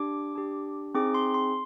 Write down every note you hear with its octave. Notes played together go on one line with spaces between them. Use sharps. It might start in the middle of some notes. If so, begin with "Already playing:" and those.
Already playing: D4 G4 D6
D4 G4
C4 D#4 G#4 D6
C6
C6